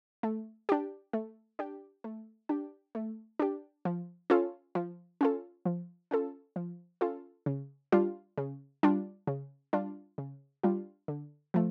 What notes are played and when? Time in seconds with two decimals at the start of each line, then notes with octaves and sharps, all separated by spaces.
0.23 A3
0.69 D4 G4
1.13 A3
1.59 D4 G4
2.04 A3
2.49 D4 G4
2.95 A3
3.39 D4 G4
3.85 F3
4.30 C#4 F4 A4
4.75 F3
5.21 C#4 F4 A4
5.65 F3
6.11 C#4 F4 A4
6.56 F3
7.01 C#4 F4 A4
7.46 C#3
7.92 G3 D4 F4
8.37 C#3
8.83 G3 D4 F4
9.27 C#3
9.73 G3 D4 F4
10.18 C#3
10.63 G3 D4 F4
11.08 D3
11.54 F3 A3